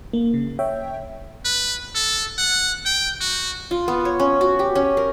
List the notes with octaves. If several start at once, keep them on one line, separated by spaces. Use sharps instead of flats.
A#3
C#3
C#5 E5 G5
B4
A4
F#5
G5
F#4
F4
B3
C#5
C#4
F#4
G4
C#4
A#4